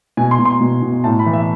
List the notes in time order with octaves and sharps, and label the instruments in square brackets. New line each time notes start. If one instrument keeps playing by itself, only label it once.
[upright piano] B2 G#5
C6
B2
C6
B2
B2
A2 A5
B5
E3
E5